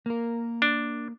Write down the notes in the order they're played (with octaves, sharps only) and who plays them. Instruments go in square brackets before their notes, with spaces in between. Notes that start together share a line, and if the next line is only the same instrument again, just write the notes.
[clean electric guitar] A#3 A#4
[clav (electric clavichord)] D4